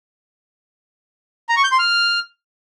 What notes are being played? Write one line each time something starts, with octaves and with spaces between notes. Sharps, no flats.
A#5
C#6
G6
C6
F6